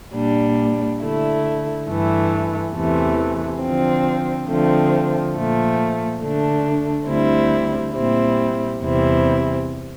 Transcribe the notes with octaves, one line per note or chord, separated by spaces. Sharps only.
A#2 G3 D4
D3 A3 E4
G2 E3 A3
E2 C3 E3 A3
D3 F3 C4
D3 F3 A3 C4
A#2 F3 A3
D3 A3 D4
D2 D3 G3 C4 E4
A#2 G3 C4 E4
E2 C3 G3 C4 E4